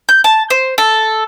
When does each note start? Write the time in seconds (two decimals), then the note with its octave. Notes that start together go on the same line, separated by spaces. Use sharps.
0.09 G6
0.24 A5
0.50 C5
0.78 A4